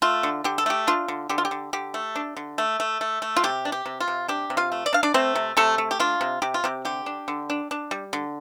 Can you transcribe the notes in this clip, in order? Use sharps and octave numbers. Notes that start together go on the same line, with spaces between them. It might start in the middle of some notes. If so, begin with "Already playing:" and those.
A3 F4
D3
D3 G4
A4
A3 G4
D4 F4
D3
D3 G4
F4
G4
D3
D3 G4
A3
D4
D3
A3
A3
A3
A3
F4
C3 G4
D4
G4
C3
F4
C3
D4 G4
C3
F4 F5
A3
D5
D4 F5
D4 D5
A3 C4 C5
C3
C3 A3 A4
A3
G4
D4 F4
C3
C3 G4
F4
C3 G4
D3 G4
D4
D3
D4
D4
G3
D3